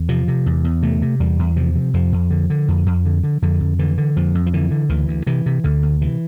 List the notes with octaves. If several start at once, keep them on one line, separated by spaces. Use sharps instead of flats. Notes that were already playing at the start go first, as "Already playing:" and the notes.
Already playing: E2
C3 F3
C3
E2
E2
C3 A3
C3
E2 G3
E2
C3 F3
C3
F2 F3
F2
D3
D3
F2
F2
D3
D3
F2 D3
F2
D3 E3
D3
F2 F3
F2
F3
D3 E3
D3
D2 E3
D2
C3 E3
C3
D2 D3
D2
C3 E3